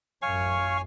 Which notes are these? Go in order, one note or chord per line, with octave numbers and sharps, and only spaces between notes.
A1 F#2 C#5 F5 G#5 C#6